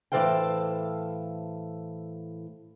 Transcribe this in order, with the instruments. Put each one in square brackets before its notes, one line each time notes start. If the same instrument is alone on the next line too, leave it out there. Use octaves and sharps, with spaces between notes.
[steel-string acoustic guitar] A2 E3 A4 C5 F5 G5